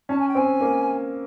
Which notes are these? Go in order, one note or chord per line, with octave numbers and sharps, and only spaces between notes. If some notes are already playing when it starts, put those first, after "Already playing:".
C#4 A5
G#5
G5
C4 G#5
A#3